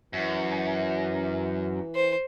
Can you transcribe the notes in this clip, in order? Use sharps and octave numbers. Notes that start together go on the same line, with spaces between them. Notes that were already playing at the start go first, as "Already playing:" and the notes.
F#2 E3
C5